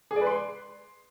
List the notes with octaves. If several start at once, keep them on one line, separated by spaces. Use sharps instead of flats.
G#4
D5
B4
C6